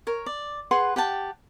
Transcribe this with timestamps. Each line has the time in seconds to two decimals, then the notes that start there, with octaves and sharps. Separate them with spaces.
0.07 A#4 C#5
0.26 D5
0.71 G#4 B4 F#5 C6
0.96 G4 F#5 G5 A5